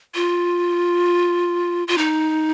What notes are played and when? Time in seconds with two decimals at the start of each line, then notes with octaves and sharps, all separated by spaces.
0.15 F4
1.88 F4
1.98 D#4